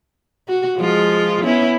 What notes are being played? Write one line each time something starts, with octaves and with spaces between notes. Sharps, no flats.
F#4
F3 G#3 F4
B3 C#4 E4